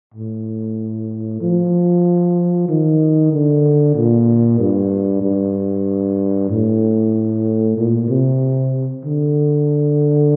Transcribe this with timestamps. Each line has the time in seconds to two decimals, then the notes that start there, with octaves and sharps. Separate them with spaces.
0.14 A2
1.41 F3
2.69 D#3
3.33 D3
3.96 A#2
4.59 G2
5.23 G2
6.50 A2
7.78 A#2
8.09 C3
9.05 D3